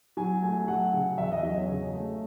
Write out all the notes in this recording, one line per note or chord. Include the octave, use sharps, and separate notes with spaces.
F#3 G#5
A3 G#5
F#3 F#5
C#3
E2 E5
D#5
F#3 D#5
C#5
C#3
A3